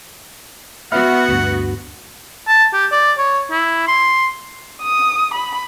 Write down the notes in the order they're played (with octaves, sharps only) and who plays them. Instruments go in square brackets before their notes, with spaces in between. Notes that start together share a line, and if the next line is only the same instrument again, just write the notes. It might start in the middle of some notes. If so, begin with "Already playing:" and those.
[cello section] B3 F#4 [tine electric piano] E5 B5 F6 [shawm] F#5
[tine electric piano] D2 G2
[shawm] A5
G4
D5
C#5
E4
C6
[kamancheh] D#6
B5